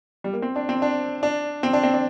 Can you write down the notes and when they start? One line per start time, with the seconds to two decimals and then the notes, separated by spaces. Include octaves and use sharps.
0.24 G3
0.33 A#3
0.42 C4
0.56 D4
0.69 C4
0.82 D4
1.23 D4
1.63 C4
1.73 D4
1.83 C4
1.94 D4